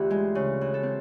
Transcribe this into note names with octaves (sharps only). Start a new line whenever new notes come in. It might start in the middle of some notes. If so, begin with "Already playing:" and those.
Already playing: D2 E3 F4 G4
G#3
C#3
E3
A4
C4